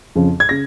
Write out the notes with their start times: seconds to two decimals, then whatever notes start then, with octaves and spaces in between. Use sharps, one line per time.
0.15 F2 C#3 F3
0.40 G#6
0.49 C#3 A#6